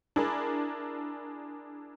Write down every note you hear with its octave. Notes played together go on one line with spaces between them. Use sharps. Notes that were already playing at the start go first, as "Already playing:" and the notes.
D4 E4 G#4 A#4